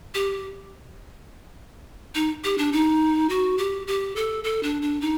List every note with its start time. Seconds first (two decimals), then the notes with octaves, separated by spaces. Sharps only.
0.14 G4
2.15 D#4
2.44 G4
2.58 D4
2.72 D#4
3.29 F#4
3.58 G4
3.87 G4
4.16 A4
4.44 A4
4.63 D4
4.82 D4
5.01 D#4